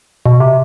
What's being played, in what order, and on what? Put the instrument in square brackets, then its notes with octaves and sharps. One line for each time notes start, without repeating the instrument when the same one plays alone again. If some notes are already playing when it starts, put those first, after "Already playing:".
[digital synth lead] B2
C3